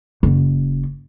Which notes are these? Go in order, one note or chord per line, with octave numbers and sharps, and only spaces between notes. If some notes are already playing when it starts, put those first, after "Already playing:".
F#1